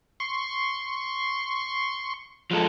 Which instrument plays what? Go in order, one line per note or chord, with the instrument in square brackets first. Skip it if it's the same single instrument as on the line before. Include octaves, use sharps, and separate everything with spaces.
[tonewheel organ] C6 C#6
[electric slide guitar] F3 G#3 A4